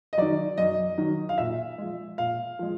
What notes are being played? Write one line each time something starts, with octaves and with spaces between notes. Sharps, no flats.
D#5
D#3 F#3 D5
F#2 D#5
D#3 F#3
F5
A#2 E5
F3 G#3
A#2 F5
F3 G#3